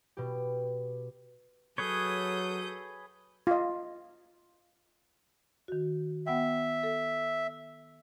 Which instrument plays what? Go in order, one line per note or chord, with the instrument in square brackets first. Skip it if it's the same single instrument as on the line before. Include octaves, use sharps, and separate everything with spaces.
[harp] B2 G4
[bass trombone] F#3 [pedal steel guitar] G#4 B4 C#5 [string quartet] A4 D#6 G6
[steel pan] F4 D#5
[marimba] D#3 F#4
[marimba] B3 F#5 G5 [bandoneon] E5
[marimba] A4